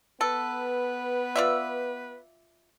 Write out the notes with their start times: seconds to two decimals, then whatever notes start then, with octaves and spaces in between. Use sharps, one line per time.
0.21 B3 A4 B4
1.36 F4 D5 E5